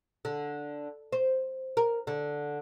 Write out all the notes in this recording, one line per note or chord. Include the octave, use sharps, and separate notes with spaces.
D3
C5
A#4
D3